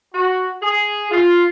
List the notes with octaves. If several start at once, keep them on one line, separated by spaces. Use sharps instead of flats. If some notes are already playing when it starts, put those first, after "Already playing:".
F#4
G#4
F4